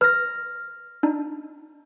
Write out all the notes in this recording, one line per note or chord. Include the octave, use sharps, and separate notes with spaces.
B4 F6 A#6
D4 D#4